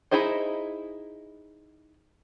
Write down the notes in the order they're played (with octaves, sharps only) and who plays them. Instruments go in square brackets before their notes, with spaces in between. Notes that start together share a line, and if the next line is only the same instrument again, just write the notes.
[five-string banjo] D#4 E4 G#4 C5 D#5